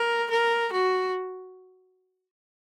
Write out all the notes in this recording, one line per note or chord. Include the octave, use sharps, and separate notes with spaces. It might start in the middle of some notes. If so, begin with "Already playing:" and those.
Already playing: A#4
A#4
F#4